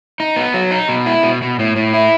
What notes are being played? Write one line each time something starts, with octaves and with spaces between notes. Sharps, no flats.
D#4
B3
F#3
D#4
B2
E4
B2
B2
A2
A2
E4